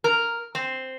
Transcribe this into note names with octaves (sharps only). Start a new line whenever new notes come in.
A#4
C4